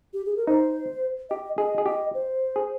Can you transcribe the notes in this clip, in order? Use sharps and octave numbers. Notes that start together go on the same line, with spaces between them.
G4
G#4
A#4
D#4 C5
G4 D#5
G#4 D#5
G#4
G4 D#5
C5
G#4